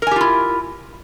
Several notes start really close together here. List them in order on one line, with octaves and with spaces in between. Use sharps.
A#4 G#5 G4 F4 E4